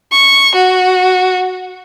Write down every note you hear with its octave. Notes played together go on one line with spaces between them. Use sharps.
C#6
F#4